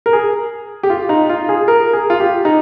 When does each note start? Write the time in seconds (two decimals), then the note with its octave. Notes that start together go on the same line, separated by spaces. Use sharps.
0.06 A#4
0.13 G#4
0.83 G4
0.90 F4
1.09 D#4
1.30 F4
1.49 G#4
1.68 A#4
1.93 G#4
2.10 F4
2.20 G4
2.45 D#4